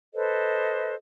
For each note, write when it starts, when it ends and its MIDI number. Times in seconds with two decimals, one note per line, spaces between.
0.14 0.94 69
0.14 0.94 71
0.14 0.94 72
0.14 0.94 75